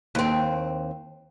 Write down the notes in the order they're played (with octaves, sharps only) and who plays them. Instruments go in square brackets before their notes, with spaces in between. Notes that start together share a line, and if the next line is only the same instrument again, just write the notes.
[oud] D#2 C4